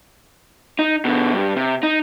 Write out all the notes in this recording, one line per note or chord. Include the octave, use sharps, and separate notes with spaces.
D#4
B2 D3
G2
C3
D#4